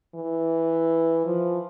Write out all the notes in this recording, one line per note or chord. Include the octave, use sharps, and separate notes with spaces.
E3
F3